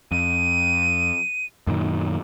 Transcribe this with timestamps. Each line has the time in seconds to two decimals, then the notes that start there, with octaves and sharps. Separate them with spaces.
0.11 F2 D#7
1.67 F#2 A#2 D#3